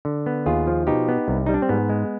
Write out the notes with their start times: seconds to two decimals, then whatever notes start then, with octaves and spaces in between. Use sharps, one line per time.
0.05 D3
0.26 B3
0.46 D#2 F4 G#4
0.67 F3
0.87 B2 D#4 G4
1.08 B3
1.28 C2
1.46 G3 D#4
1.54 D4
1.62 C4
1.69 G#2 B3
1.89 G#3